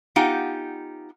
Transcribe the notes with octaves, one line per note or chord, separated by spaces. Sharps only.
B3 D#4 F4 G4 F#5 G#5